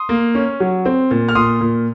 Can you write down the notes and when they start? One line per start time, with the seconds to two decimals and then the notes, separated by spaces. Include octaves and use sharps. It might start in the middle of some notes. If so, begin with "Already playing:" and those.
Already playing: C6 D#6
0.09 A#3
0.35 C#4
0.60 F#3
0.86 C4
1.11 A#2
1.29 F6
1.35 A#2 C6 D#6
1.61 A#2